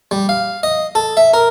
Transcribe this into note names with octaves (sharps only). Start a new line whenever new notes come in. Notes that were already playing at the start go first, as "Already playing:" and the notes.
G3
F5
D#5
A4
E5
A#4